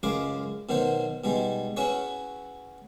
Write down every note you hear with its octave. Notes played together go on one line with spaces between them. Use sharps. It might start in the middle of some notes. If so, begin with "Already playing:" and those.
C#2 F#2 G#3 G#4 F5 D6
B2 D#3 F#3 D#4 C5
B2 G3 G#3 D#4
C#4 E4 F#4 G#4 B4 C#5